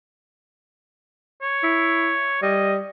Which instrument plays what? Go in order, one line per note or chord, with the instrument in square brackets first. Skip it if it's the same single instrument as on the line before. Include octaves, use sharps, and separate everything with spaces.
[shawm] C#5
[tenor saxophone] E4
[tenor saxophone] G3 [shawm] D#5